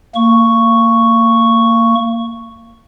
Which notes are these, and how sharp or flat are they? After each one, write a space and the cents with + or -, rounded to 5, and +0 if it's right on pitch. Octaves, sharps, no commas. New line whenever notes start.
A#3 -25 C#6 +0